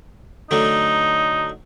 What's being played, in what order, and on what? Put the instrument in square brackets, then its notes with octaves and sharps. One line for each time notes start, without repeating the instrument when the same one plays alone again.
[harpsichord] D3 F#3 A3 [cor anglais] D#4